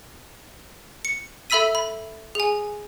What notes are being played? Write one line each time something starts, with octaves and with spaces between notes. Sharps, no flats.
C#7
A4 E5 B5 E6 B6 D#7
B5
G#4 G#5